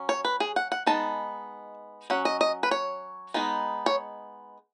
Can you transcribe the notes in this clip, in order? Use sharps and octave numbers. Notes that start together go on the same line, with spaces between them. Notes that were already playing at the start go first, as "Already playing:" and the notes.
Already playing: F#3 C#4
C#5
B4
G#4
F#5
F#5
G#3 B3 D#4 A5
F#3 C#4 F#5
D#5
D#5
B4
C#5
G#3 B3 D#4
C#5